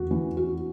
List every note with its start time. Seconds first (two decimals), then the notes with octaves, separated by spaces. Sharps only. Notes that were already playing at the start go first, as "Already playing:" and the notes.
Already playing: E2 F#4
0.11 E3
0.37 F#4